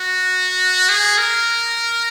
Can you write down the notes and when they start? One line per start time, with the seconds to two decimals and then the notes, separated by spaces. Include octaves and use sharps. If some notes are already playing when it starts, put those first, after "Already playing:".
Already playing: F#4
0.89 G#4
1.18 A#4